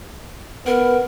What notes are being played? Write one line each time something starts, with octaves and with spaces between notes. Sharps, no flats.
B3 A#4 F#5